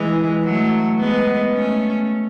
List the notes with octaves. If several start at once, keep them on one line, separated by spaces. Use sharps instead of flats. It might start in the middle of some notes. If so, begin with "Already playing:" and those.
Already playing: E3 G#3
F#3 A3
G#3 B3
A3 C#4